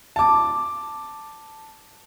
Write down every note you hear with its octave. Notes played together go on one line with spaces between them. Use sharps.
A5 D6